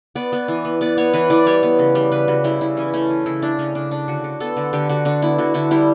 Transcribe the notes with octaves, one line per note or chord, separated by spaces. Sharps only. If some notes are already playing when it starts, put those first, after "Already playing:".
B3 D5
B3
E3
B3
B3 D5
B3 C#5
E3 B4
E3 D5
G3 C#5
B3
C#3
G3
C#3 B4
C#3 F#4
G3 E4
C#3 E4
E3 C#4
A3 C#4
E3
C#3 E4
A3 D4
C#3 C#4
C#3 D4
C#3 D4
D3 F#4
D3
B3 A4
D3
D3 G4
D3 F#4
D3 D4
B3 E4
D3 F#4
D3 E4
G3 E4